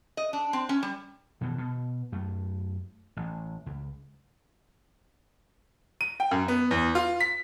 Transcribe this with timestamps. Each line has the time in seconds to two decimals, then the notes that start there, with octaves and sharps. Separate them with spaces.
0.17 D#5
0.33 D4
0.53 C4
0.69 C#4
0.83 G3
1.41 B2 D#3 E3
1.58 B2
2.12 F#2 A3
3.17 A1
3.66 C#2
6.01 D#7
6.20 G5
6.31 F#2
6.48 B3
6.71 E2
6.95 F4
7.20 B6